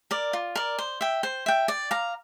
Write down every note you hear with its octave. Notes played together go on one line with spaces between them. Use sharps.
A#4 D5
F4
A#4 D5
C5
E5 G5
C5
E5 G5
D5
F5 A#5